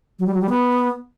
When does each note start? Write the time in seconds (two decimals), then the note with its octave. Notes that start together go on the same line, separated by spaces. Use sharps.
0.19 F#3
0.27 G3
0.34 F#3
0.42 G3
0.49 B3